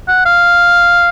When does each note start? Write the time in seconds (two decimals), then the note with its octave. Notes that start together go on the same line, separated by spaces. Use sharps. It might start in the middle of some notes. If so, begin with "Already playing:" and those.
0.08 F#5
0.26 F5